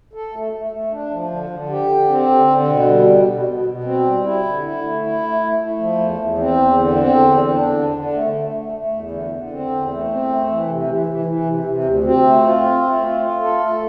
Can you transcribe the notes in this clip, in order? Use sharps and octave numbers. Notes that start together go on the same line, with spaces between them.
A4
A3
A3
A3
D4
F3
D3
D3
G4
D3
C4
D3
D3
B2
G3
B2
B2
B2
B2
C4
G3
E4
D3
E4
A3
E4
A3
A3
A3
F3
E2
E2
C4
E2
D3
C4
E2
D3
D4
D3
D3
A3
A3
A3
A3
E2
D3
D3
C4
E2
A3
C4
A3
E3
C3
E3
E3
E3
C3
C3
D2
C4
A3
F4
C4
A3
F4
F4
A4
A3